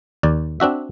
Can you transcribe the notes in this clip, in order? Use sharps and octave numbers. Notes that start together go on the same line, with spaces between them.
D#2 D5
C4 D4 F#4 E5